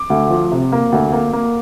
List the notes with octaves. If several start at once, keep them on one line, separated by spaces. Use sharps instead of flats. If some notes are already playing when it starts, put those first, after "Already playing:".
Already playing: D6
D2
F3
C3
A#3
D2
A#3
A#3